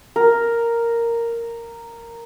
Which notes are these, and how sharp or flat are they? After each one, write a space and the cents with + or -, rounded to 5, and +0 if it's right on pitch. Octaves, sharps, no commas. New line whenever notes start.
A#4 -5